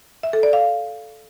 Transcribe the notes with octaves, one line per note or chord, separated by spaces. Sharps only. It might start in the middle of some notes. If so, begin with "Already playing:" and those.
E5
A4
D5
F5